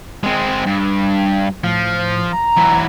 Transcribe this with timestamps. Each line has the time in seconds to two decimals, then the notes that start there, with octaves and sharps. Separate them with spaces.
0.23 G#3 C4
0.67 G2
1.64 A2 F3
2.32 A#5
2.57 E3 F#3